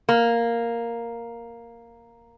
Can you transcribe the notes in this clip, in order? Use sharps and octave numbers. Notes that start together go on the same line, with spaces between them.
A#3